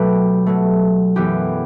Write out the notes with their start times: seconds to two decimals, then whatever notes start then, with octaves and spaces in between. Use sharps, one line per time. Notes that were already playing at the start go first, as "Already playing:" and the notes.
Already playing: B2 F#3 A3 G4 B4
0.46 B2 F#3 A3
1.16 F#2 E3 B3 G4